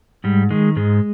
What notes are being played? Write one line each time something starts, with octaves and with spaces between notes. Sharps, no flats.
G#2 G3
D#3 G#3
G#2 G#3